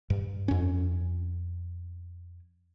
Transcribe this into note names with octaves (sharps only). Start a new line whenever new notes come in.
G2
F2 C#4